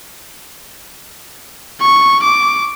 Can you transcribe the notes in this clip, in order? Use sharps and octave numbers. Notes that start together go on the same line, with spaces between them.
C#6
D6